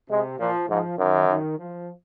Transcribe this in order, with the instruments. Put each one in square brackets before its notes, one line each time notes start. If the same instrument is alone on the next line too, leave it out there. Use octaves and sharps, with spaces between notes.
[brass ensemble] C3 [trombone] G#3
[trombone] A#2 [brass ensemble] F3
[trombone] G#2 [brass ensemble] F3
[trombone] F#2 [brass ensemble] D#3
[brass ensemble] D#3
F3